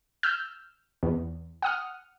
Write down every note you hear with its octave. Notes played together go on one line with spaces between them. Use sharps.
E6 F6 G6
E2
F#5 D#6 F6